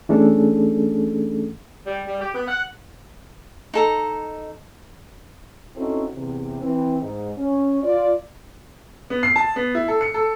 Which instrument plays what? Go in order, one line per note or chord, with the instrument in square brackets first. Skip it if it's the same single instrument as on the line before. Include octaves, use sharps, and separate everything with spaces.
[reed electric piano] E3 A3 C#4 D4 G#4 A4
[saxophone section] G3
G3
G4
B3
F#5
[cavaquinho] D#4 A4 A#5
[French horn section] C4 C#4 D#4 E4 F#4 A4
E2 C3
E3 C4
G#2
C#4
F4 D5
[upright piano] B3
C7
A5
B3
E4
A4
C#7
A4